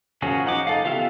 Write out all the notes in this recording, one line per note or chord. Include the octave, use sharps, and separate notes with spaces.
F3 C#4 F#4 G#4 A#4
D#4 F#5 D6
D#4 A4 F5
B3 F4 G4 E5 F5